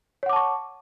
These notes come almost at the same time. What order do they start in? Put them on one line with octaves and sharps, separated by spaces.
C#5 F#5 D6 A5 C#6